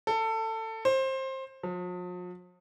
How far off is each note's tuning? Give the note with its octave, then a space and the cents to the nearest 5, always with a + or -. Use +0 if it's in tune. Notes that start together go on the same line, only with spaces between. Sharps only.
A4 +20
C5 +20
F3 +45